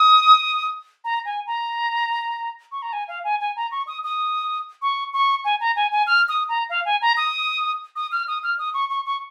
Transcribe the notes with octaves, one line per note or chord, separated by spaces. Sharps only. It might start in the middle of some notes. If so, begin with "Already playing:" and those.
Already playing: D#6
A#5
G#5
A#5
C#6
A#5
G#5
F5
G#5
G#5
A#5
C#6
D#6
D#6
C#6
C#6
G#5
A#5
G#5
G#5
F6
D#6
A#5
F5
G#5
A#5
D#6
D#6
F6
D#6
F6
D#6
C#6
C#6
C#6